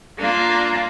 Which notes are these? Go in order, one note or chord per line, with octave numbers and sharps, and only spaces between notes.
A#3 D4 F4